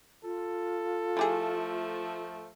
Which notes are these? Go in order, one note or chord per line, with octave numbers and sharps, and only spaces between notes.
F4 A4
F3 A3 E4 G4 G#4